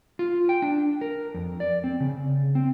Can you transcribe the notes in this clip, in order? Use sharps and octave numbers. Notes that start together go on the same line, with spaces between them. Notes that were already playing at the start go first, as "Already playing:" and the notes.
F4
G5
D4
A#4
F2
D5
C4
C#3
C4